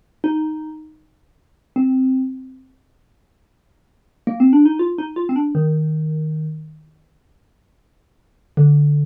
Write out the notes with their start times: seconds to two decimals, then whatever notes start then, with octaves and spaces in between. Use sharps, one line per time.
0.24 D#4
1.76 C4
4.27 A#3
4.40 C4
4.53 D4
4.66 D#4
4.79 F4
4.98 D#4
5.16 F4
5.29 C4
5.36 D4
5.55 D#3
8.57 D3